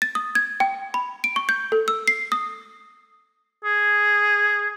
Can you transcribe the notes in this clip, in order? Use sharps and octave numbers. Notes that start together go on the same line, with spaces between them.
A6
D#6
G#6
G5
B5
D7
C#6
G6
A4
E6
C7
D#6
G#4